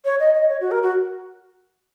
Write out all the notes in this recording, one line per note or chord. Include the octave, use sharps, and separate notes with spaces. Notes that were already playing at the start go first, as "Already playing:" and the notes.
C#5
D#5
D#5
C#5
F#4
A#4
F#4